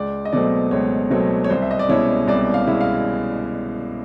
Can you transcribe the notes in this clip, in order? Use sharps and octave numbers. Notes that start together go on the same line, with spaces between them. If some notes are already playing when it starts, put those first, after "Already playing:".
Already playing: C#2 D5
D#5
B2 F#3 A3 C4 D5
C#2 C#5
B2 F#3 A3 C4 C#5
C#5
C2 C5
E5
D#5
D5
B2 G#3 C#4 E4 C#5
C2 D5
F5
B2 G#3 C#4 E4
F5